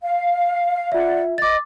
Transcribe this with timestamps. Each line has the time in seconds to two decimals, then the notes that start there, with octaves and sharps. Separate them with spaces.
0.01 F5
0.92 F4 D5 E5 F#5
1.38 D#5 D6 A6